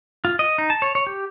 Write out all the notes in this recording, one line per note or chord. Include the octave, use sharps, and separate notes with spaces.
F4
D#5
D#4
A5
C#5
C#5
G4